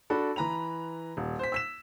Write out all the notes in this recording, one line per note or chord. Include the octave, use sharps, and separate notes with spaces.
D4 F#4 A4 B5
E3 B4 A#5 B5 F7
D#1
C5 B6
E6 B6 E7